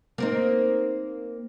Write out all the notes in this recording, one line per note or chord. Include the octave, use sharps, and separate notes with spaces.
A#3 C4 D#4